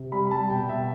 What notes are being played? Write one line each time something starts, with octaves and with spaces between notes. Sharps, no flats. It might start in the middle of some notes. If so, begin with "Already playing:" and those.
Already playing: C3
G3 B5
B5
G3 A5
B2 G5
B2 E5